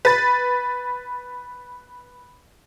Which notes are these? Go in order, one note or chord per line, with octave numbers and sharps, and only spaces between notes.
B4 A6